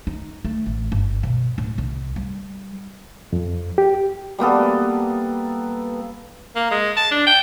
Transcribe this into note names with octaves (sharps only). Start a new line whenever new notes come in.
D#4
A3
A1
G1
B2
D1
C2
G3
F2
G4
G3 A#3 B3 A4
A#3
G#3
A5
D4
G5